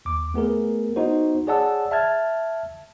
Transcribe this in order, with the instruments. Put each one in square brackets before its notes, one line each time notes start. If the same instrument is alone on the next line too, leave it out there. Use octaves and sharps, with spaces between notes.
[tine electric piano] D#2 D6
A3 B3 G#4 A#4
B3 D#4 F#4 C5
G#4 C#5 D5 F#5 A5 E6
E5 A5 F6 G#6 A6